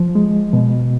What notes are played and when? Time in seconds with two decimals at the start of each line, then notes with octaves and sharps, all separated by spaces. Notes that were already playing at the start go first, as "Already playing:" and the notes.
Already playing: F3
0.15 G#3
0.53 B2